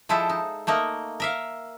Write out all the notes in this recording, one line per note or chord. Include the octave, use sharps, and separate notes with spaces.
F3 G#3 E4 A4 C5
D#4
A3 A#3 D#4 A#4
A#4 E5 F5